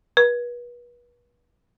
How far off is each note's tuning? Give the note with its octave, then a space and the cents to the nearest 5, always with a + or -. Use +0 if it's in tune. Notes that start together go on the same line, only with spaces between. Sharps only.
B4 -35